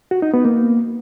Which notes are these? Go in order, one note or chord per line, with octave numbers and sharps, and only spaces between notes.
F#4
D#4
B3
A#3